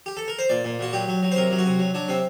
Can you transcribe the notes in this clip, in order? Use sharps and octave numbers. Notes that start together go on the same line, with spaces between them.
G4
A4
A#4
C5
A#2 D5
A#2
A#2 F#4
F#3 G4
F#3
F#3
C5
C3 A#4
F#3
F#4
C3
F#3
F#3 D4
C3 C4